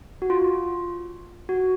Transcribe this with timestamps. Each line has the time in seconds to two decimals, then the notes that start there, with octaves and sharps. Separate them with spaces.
0.22 F#4
0.30 F4
1.49 F#4